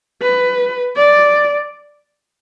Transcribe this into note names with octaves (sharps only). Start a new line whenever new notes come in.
B4
D5